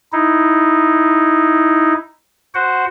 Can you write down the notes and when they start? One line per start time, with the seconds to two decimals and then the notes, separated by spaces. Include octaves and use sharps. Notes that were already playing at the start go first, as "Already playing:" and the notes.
0.13 D#4 E4
2.55 F#4 C5 F#5